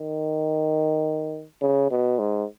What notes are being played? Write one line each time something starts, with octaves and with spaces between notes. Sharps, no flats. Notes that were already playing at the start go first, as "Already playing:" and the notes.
Already playing: D#3
C#3
B2
G#2